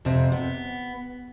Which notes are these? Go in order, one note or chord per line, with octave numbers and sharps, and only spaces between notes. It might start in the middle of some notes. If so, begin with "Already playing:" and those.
F2 C3
B3